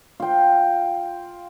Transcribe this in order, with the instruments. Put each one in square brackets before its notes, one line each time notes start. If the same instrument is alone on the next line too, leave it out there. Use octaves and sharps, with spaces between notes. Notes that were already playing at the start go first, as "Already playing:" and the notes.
[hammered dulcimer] F4 G5